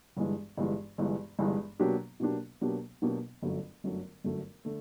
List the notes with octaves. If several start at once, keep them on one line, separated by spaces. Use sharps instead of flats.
G1 G2 E3 G#3
G1 G2 E3 G#3
G1 G2 E3 G#3
G1 G2 E3 G#3
B2 F#3 A#3 D4 G4
B2 F#3 A#3 D4 G4
B2 F#3 A#3 D4 G4
B2 F#3 A#3 D4 G4
G1 F#2 D3 F#3 A3
G1 F#2 D3 F#3 A3
G1 F#2 D3 F#3 A3
D3 A3